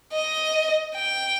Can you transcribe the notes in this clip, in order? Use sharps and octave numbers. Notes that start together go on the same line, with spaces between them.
D#5
G5